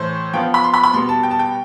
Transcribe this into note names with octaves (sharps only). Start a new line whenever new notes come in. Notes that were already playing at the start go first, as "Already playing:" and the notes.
Already playing: A2 E3 A3 C5
F3 B3 F4 G5
B5
C6
B5
B5
B2 G3 B3 C6
A5
G5
A5
G5